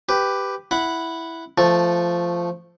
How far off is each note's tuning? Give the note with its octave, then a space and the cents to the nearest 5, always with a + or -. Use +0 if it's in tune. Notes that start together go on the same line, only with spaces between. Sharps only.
G4 +0 B4 +10
E4 +0 F#5 -5 B5 +0
F3 -10 A3 +0 A4 +0